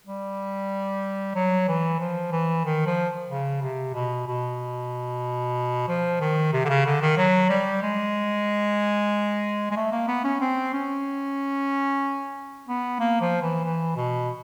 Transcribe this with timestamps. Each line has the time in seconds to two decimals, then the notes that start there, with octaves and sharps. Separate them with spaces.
0.06 G3
1.35 F#3
1.68 E3
2.00 F3
2.32 E3
2.65 D#3
2.86 F3
3.29 C#3
3.62 C3
3.94 B2
4.27 B2
5.88 F3
6.21 D#3
6.53 C3
6.65 D3
6.69 C#3
6.86 D3
7.02 D#3
7.17 F#3
7.50 G3
7.83 G#3
9.71 G#3
9.77 A3
9.92 A#3
10.08 B3
10.25 C#4
10.41 C4
10.74 C#4
12.68 B3
13.00 A#3
13.21 F3
13.42 E3
13.64 E3
13.96 B2